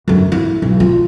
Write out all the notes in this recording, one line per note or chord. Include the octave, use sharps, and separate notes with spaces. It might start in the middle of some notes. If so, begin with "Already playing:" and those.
F#2 D3
E4
B1
F4